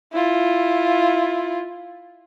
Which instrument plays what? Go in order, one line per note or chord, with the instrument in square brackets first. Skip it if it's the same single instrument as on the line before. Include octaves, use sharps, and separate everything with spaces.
[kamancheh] E4 F4